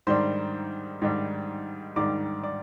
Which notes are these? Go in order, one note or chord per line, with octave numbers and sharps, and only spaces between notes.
G#2 D#3 G3 D4 C5 C6
G#2 D#3 G3 D4
G#2 D#3 G3 D4 D5 D6
D5 D6